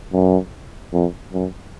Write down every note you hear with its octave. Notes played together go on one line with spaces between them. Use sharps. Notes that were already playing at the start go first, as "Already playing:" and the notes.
F#2
F2
F#2